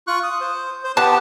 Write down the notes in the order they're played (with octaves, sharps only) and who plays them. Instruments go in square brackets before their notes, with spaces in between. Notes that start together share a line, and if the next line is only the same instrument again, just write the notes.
[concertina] F4 C#6 F#6
D#6
C5
C5
[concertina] B3 G4 B4 [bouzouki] A5